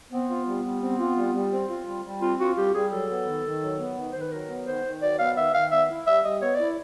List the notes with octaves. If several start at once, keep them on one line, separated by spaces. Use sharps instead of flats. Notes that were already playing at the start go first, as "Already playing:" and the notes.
B3 C4
F4
G3
G3
C4
F4
G3
G3
C4
F4
G3
G3
C4 F4
F4 F#4
G3 G4
G3 G#4
F#3 A4
B3
D#3
D#3
F#3
B3
D#3
D#3 C5
B4
F#3 A#4
B3
D#3 C5
D#3
F#3 D5
B3 F5
D#3 E5
D#3 F5
B3 E5
E4
G3 E5
G3 D#5
B3 C#5
E4 D5